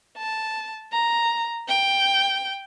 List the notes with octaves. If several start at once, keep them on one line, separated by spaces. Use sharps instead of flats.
A5
A#5
G5